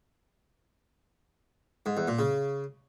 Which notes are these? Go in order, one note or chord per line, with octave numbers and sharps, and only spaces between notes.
G#2
E2
A#2
C#3